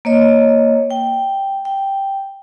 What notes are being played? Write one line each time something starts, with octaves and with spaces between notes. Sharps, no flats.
A#3 C#5 D#5
G5
G5